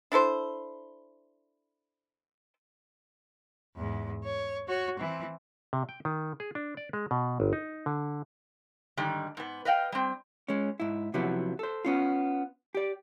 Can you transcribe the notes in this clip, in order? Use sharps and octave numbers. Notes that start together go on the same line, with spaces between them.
D4 E4 A4 C5
E2 G#2
C#5
F#4 C#5
E3 C4
C3
G5
D#3
G#4
D4
D5
G#3
B2
G1
D#4
D3
G#2 D3 D#3 G3
G#2 B3
B4 D#5 F5 G5
G3 C4
G#3 C#4
G#2 E4
C3 F3 F#3 B3 E4
A4 C5
B3 C#4 F4
G4 D5